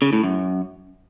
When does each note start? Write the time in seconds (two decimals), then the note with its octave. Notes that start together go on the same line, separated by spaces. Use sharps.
0.02 C#3
0.13 A2
0.24 F#2